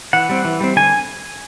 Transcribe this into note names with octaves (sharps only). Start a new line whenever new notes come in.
E3 F#5
G3 C4
E3
G3 C4
D3 G#5